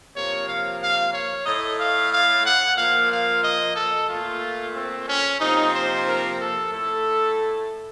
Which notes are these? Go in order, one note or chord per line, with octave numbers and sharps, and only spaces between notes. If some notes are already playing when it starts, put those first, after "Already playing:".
C3 F3 A#3 C#5
F5
F5
C#5
A2 A3 D#5
F5
F5
F#5
A#2 F3 A#3 F5
F5
D#5
A4
A#2 A3 F4
C4
C#4
C3 F3 A#3 D#4
C5
A#4
A4
A2 A3 A4